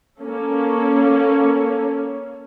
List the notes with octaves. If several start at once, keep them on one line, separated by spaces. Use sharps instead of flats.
A#3 C#4 A4 C#5